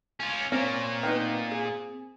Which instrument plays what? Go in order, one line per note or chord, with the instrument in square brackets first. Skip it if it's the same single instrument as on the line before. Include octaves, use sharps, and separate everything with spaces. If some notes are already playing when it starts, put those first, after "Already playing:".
[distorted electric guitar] C#4 F4
[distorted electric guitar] A#2 A#3 [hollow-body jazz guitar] C4 [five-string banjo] C#4
[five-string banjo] D#3 B3 D#4
G#4